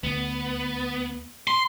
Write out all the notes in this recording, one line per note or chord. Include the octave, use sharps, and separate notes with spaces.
D2 B3
C6